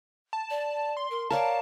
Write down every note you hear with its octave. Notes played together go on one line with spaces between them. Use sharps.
A5
D5
C6
A#4
A#4 C#5 D5 F5 A5